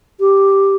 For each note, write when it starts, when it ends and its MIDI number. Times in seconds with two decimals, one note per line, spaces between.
0.20 0.76 67